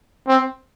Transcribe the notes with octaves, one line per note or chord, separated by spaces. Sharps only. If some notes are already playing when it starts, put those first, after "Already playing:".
C4